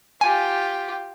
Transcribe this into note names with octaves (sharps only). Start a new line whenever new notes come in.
F4 G4 G#5